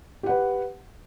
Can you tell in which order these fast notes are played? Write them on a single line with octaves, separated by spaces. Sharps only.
G4 F#5 B4